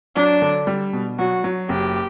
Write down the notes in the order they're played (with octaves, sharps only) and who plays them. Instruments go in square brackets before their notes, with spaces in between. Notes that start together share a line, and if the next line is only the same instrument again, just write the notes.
[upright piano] F#3 [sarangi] D4
[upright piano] D3
G3
B2
[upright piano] F#3 [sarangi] F#4
[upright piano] F#3
[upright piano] F#1 [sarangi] G4